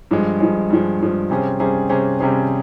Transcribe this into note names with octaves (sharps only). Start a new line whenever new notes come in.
G2 F3 G#3
G2 F3 G#3
G2 F3 G#3
G2 F3 G#3
C3 G3 C#4 G#4 C5
C3 G3 C#4 G#4 C5
C3 G3 C#4 G#4 C5
C3 G3 C#4 G#4 C5